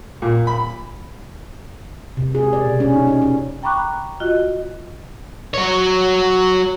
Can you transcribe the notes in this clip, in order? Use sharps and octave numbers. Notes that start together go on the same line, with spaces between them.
A#2
B5
C3
G#4
D5
B2
C#4
D#4
C#4
C#4
G5 A#5 B5 C#6 D6 F#6
F4 F#4 D#5
F#3 C#5